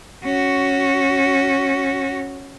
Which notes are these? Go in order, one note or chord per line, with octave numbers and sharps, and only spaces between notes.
C#4 F#4